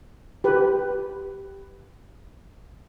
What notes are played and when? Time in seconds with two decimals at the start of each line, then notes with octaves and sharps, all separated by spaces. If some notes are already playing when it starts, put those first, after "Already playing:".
0.44 G4 B4